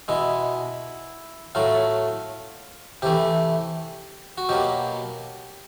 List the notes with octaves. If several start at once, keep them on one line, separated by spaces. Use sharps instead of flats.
B2 G#3 E4
A2 F#3 A3 F4
C3 E3 A3 G4
F#4
B2 F#3 A#3 G4